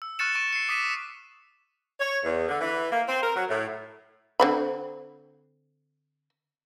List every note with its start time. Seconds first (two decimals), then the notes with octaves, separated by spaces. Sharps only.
0.02 E6
0.19 C#6 F6 F#6 A6 C#7 E7
0.35 C#6 D7
0.53 C7 C#7
0.69 D6 D#6 B6 D#7 E7
1.99 C#5
2.24 E2
2.48 D3
2.60 E3
2.91 A#3
3.06 C4
3.21 A#4
3.35 F#3
3.49 A2
4.40 D3 C4 B5